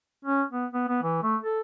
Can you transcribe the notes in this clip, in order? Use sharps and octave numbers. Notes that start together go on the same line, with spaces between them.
C#4
B3
B3
B3
E3
A3
A4